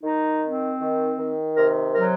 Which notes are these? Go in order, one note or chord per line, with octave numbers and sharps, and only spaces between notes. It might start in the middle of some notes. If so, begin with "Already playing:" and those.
D#3 D#4
C4
D#3
D#3
C3 A#4
F#3 A#4